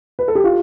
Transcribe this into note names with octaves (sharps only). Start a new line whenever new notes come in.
B4
A4
G4
F4